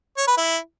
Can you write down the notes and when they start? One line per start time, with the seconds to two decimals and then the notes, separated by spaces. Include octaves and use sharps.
0.18 C#5
0.28 B4
0.38 E4